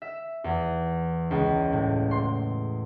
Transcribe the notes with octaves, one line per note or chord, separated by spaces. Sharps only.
E5
E2
C#2
A2
C6